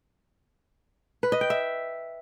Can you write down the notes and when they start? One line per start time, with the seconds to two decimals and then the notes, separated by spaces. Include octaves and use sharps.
1.23 B4
1.32 D#5
1.41 G5
1.50 E5